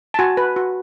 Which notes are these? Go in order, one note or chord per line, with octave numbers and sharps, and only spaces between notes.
A5
F#4 G#5
B4
F#4